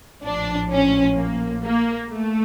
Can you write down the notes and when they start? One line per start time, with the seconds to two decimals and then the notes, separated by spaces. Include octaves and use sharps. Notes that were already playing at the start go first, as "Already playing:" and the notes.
0.24 A#1 A2 F3 D4
0.71 C#4
1.17 A#3
1.64 A#3
2.11 A3